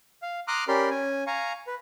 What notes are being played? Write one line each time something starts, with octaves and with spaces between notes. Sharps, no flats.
F5
A#5 C6 D6 D#6 F6 F#6
C#4 G4 A#4 D5 B5 C6
C#4 G#5
F5 G#5 A#5 C#6
B4